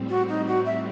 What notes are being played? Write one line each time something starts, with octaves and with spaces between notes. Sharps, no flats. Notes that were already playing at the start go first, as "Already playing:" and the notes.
Already playing: A2 G3 C4
F#4
D#4
F#4
E5